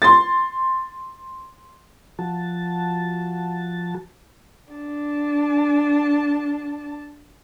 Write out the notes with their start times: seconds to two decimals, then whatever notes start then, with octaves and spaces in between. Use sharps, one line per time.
0.02 C6 A6
2.19 F3 F#4 A5
4.73 D4 A5